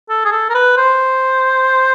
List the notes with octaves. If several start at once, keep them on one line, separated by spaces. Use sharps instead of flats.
A4
G#4
A4
A#4
B4
C5